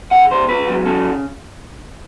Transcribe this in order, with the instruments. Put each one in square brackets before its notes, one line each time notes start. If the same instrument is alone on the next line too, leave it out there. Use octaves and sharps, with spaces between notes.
[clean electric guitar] C#3 F#5
C#2 C5
C#2 B4
F#3
C#3 A4